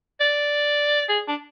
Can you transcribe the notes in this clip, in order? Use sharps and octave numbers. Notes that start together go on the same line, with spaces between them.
D5
G#4
D4